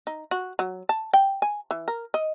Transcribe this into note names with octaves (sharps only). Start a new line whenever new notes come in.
D#4
F#4
F#3
A5
G5
G#5
E3
A#4
D#5